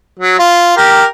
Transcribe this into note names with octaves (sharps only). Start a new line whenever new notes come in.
F#3
F4
G4 A#4